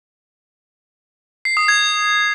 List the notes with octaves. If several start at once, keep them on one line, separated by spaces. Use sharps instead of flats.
C7
D#6
G#6